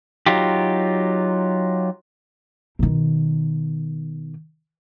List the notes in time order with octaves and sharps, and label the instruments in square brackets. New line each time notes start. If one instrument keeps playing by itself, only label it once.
[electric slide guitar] F#3 D#4 F4 G4
[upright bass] B2 D#3